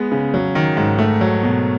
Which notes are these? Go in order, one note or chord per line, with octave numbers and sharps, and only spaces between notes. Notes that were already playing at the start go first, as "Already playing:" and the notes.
Already playing: G#3 B3
C#3
F#3
D#3
G#2
A3
F#3
B2